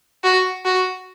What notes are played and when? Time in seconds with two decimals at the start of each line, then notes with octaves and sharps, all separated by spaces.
0.24 F#4
0.65 F#4